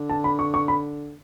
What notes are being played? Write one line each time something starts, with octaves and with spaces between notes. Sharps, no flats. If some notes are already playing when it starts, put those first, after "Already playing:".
Already playing: D3
A5
B5
C#6
C#6
B5